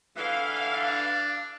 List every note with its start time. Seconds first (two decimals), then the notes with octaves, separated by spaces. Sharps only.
0.17 D3 E3 F5
0.74 D4